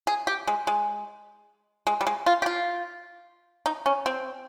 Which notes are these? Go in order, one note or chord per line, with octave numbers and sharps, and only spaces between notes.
G#4
G4
G#3
G#3
G#3
G3
G#3
F4
G4
F4
D#4
C#4
C4